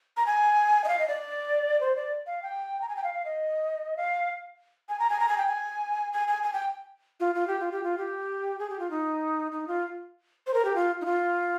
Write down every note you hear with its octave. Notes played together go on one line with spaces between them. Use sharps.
A#5
G#5
D#5
F5
D#5
D5
C5
D5
F5
G5
A#5
G#5
G5
F5
F5
D#5
F5
G#5
A#5
G#5
A#5
G#5
G5
G#5
G#5
G#5
G#5
G5
F4
F4
G4
F4
G4
F4
G4
G#4
G4
F4
D#4
D#4
F4
C5
A#4
G4
F4
D#4
F4